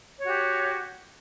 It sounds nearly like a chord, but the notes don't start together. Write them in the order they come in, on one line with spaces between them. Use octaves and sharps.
C#5 F#4 G4